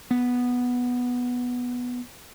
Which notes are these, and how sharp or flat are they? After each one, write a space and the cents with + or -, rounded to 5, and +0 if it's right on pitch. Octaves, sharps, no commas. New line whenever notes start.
B3 -5